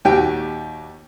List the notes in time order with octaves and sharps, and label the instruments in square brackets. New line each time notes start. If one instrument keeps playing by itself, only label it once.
[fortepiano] D#2 A#2 F#4 G4 G5